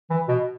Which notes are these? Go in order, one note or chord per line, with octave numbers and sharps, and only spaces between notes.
E3
B2